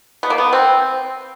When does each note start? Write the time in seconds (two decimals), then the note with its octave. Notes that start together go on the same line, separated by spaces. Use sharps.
0.23 B3
0.30 A#3
0.38 B3
0.53 C4